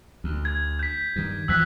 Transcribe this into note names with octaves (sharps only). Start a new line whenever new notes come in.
D2
G#6
G6 B6
G2 D#3
E2 E3 F3 E6 F#6 B6